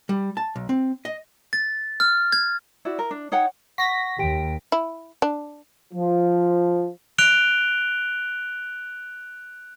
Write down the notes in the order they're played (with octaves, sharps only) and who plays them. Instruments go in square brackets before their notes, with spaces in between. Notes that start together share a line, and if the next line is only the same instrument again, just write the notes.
[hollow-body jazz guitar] G3
A5
B1
C4
D#5
[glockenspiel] A6
F6
G#6
[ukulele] E4 F#4 D5
A#4
D4
D#4 C#5 F#5 G5
[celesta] F#5 C#6 [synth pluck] A#6 B6
[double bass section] D#2 [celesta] G4 G5 D7
[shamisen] E4
D4
[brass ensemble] F3
[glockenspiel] F#6 D7 F7 G7